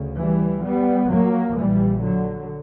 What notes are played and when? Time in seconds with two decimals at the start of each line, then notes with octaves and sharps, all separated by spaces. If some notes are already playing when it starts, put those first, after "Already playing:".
Already playing: D2 C#3
0.18 E3 G3
0.64 G3 B3
1.10 F#3 A#3
1.55 A#1 A#2 E3 G3
2.01 D3 F#3